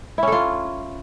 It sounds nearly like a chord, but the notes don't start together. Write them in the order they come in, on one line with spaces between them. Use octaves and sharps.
E4 C#4 A4 F4